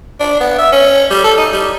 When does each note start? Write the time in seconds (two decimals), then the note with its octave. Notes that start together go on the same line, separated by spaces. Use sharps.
0.20 D4
0.40 B3
0.58 E5
0.73 C#4
1.11 G3
1.24 A4
1.38 D#4
1.53 G3